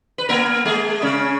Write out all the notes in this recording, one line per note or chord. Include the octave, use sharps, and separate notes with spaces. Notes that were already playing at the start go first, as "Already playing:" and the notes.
B4
A#3 A#4
G#3 G#4
C#3 C#4